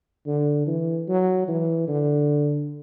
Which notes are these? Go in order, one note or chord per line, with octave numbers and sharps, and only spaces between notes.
D3
E3
F#3
E3
D3